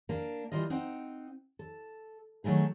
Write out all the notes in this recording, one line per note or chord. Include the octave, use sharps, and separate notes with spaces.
A#3 D4
E3 G3 A#3 F4 D#5
C4 D#4 F#5 G5
A4
D#3 F#3 A3 D#4 G#4